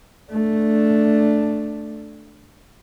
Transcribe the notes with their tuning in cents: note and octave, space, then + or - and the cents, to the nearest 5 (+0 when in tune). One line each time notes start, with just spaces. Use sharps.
A3 +0 D4 +0